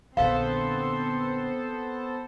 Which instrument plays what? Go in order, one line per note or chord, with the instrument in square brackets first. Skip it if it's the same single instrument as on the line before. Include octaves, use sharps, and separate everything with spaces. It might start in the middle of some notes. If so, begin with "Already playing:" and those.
[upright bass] A#1 D3 [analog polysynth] B3 A4 C5 [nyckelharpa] C4 C6 [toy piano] F5